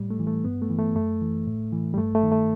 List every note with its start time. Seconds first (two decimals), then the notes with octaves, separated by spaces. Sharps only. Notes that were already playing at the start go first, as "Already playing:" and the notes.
Already playing: A2 G3
0.10 A3
0.20 E3
0.27 A3
0.45 G2 B3
0.62 A3
0.70 E3
0.79 A3
0.96 F#2 A3
1.21 E3
1.47 A2
1.72 E3
1.94 G3
1.98 G2 A3
2.15 A3
2.23 D#3
2.32 A3